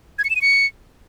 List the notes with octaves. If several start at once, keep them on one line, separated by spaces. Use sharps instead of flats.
G#6
C#7
E7
D#7
C#7